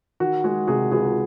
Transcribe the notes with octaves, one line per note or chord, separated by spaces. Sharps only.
D#3 F#4
G#3 F#4 G#4
C3 F#4 G#4
C#2 F#4 G#4